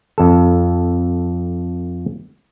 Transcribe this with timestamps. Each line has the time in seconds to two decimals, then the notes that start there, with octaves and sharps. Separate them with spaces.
0.18 F2 A4